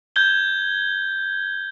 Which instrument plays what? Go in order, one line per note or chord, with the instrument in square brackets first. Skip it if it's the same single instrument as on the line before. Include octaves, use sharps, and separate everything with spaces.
[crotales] G6 G#6 G7